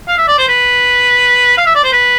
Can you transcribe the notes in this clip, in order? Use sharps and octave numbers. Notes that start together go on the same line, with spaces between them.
F5
E5
D5
C5
B4
F5
E5
D5
C5
B4